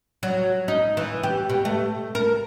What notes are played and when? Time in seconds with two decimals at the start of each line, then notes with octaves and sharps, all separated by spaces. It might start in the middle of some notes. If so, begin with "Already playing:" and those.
0.23 F#3
0.68 D#4
0.97 E3
1.23 G4
1.49 B2
1.65 A3
2.15 A#4